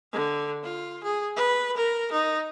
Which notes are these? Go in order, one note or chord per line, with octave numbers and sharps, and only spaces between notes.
D3
F4
G#4
B4
A#4
D#4